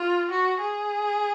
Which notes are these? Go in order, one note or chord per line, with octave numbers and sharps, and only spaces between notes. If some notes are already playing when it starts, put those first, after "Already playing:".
Already playing: F4
F#4
G#4